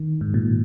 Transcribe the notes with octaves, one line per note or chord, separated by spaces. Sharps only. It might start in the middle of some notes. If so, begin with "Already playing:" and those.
Already playing: D#3
G#2
A#2